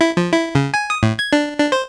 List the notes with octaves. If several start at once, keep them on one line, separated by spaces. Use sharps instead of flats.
E4
F3
E4
C#3
G#5
D#6
A2
G#6
D4
D4
C5